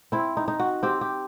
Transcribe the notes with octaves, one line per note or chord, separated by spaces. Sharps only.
C4 E4
D#4
D#4
F#4
C4 G4
G4